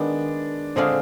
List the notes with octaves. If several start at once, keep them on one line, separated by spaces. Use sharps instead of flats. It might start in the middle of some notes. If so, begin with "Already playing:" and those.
Already playing: D#3 G#3 B3 D4
D3 G#3 C4 D4 F4